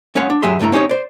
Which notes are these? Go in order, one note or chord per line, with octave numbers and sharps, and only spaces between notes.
G#3 C#4 C#5 F5 F#5
D4
F#2 F#3 G4 G#4 E5 C6
C#2 G2 A3 E4 A#5
C4 C#4 D#4 G4 C#5
C5 D5